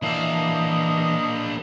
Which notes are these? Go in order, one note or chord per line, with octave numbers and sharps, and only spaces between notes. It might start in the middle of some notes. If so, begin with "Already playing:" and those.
E3 A#3 D4 D#5 E5